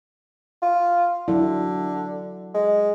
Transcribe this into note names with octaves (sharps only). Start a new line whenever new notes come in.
F4
D3 F#3 E4
G#3